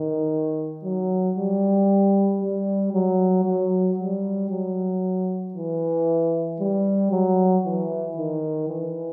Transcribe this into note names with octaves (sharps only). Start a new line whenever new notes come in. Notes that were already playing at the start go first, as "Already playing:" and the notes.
Already playing: D#3
F#3
G3
G3
F#3
F#3
G3
F#3
E3
G3
F#3
E3
D#3
E3